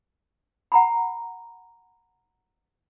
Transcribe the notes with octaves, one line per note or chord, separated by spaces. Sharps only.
F#5 A#5 B5